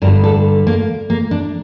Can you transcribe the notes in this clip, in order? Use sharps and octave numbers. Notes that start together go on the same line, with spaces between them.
G2 D3 G3 A#4
A4
A#3
A#3
D4